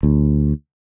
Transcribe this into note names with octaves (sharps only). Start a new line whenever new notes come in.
D2